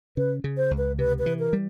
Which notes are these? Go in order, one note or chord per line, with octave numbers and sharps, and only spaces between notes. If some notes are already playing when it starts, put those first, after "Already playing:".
C#3 B4
C#3
C5
C#2
B4
C3 B4
B4
E3
A#4
G3